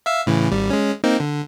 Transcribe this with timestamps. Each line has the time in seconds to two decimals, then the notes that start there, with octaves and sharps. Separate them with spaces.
0.06 E5 F5 E6
0.27 A2 C#3 E3
0.51 G#1 G3
0.70 G#3 C#4
1.04 A#3 C4 D#4
1.20 D3